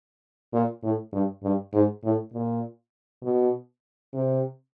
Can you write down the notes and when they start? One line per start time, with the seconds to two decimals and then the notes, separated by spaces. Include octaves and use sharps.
0.53 A#2
0.84 A2
1.13 G2
1.43 G2
1.73 G#2
2.04 A2
2.33 A#2
3.23 B2
4.14 C3